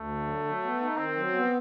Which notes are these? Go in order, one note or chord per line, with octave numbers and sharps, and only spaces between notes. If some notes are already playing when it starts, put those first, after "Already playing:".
Already playing: D2 A3
D3
F#3
F#3
B3
D#4
D#3 C4
F#3
B3